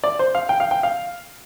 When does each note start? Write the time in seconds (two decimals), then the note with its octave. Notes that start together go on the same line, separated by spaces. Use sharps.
0.04 D5
0.19 C5
0.35 F5
0.49 G5
0.60 F5
0.71 G5
0.83 F5